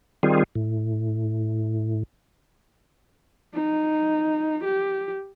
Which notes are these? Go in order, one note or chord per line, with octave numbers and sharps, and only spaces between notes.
D#3 G3 C4 F4 G#4
A2
D#4
G4